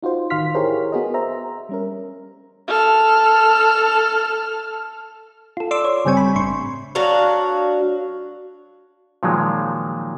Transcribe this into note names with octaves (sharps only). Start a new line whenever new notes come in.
D#4 F4 F#4 C5
A1 D#3 F5 C6 F6 B6
E4 G4 G#4 A#4 C5 C#5
B3 F#4 G#4 A#4 D#5
C5 E5 A#5
G3 C#4 A#4
A4 F6
F4 A4
D5 C6 D6 E6
C#5
G1 C#3 G3 C4 G#5 C#6
B5
G1 A2 C6 C#6
F#3 D4 F#4 F5
A#2 D#3 F3 F#3 G#3